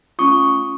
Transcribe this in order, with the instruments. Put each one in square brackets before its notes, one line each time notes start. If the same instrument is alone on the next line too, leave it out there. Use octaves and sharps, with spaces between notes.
[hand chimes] A3 C#4 F4 C#6 D#6